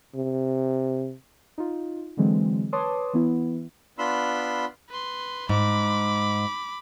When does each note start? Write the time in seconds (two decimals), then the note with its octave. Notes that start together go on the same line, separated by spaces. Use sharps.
0.15 C3
1.58 D#4 F4
2.17 D3 E3 F#3 G#3 C4
2.73 B4 C#5 A5 C6 D6 D#6
3.13 E3 B3 E4
3.98 B3 D4 F4 B5 C6 E6
4.89 B4 C6
5.49 G#2 B5 D6